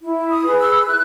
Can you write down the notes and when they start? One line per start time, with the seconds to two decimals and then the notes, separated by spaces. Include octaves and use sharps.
0.02 E4
0.30 D#6
0.43 G#4 B4
0.57 E6
0.86 E4 F#6